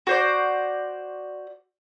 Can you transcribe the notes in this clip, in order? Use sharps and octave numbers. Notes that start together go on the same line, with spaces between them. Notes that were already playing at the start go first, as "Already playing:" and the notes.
F#4 C5 D5